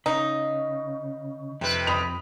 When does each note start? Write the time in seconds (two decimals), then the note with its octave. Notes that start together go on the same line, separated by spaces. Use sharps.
0.06 C#3 D#4
1.61 F2 C3 B4
1.87 B5 D#6 F7